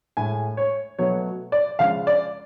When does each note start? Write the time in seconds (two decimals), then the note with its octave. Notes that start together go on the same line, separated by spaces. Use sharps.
0.17 A2 G#3 G#5
0.57 C#5
0.99 B2 F#3 A3 C#5
1.52 D5
1.79 C#3 F3 G#3 F5
2.07 D5